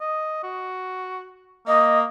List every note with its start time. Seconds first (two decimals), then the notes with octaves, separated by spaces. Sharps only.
0.01 D#5
0.43 F#4
1.67 A#3 D#5